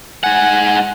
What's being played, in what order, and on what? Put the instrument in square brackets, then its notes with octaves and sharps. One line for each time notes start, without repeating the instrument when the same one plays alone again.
[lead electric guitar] G#2 F#5 [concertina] G#5